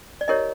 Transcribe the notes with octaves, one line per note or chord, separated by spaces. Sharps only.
D5
E4 G4 A#4 C#5 D#5